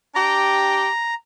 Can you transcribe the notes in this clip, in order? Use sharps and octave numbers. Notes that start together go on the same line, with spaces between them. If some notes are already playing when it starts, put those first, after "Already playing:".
D4 G4 A#5